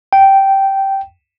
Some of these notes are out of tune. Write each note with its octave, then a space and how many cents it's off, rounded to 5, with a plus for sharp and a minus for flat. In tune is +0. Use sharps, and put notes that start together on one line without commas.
G5 -10